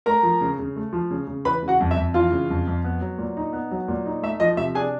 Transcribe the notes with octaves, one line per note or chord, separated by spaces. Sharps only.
A3 A#4 A#5
F3
C#3
C#3
A3
F3
C#3
C#3
E3 B4 B5
C#3
F#4 F#5
F2
E5
F2
E3 F4 F5
C#3
F2
F2
B3
F#3
A#2
D#4
B3
F#3
A#2
D#4
A3 E5
F3 D#5
C3 E5
D4 G#4 G#5